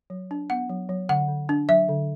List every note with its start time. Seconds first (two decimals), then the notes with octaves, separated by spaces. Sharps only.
0.10 F#3
0.31 D4
0.50 B3 F#5
0.69 F#3
0.89 F#3
1.09 D3 F#5
1.29 D3
1.49 D4
1.69 F#3 E5
1.89 D3